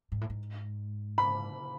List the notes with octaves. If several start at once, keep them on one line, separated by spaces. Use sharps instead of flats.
G#2
A2
G#2
B5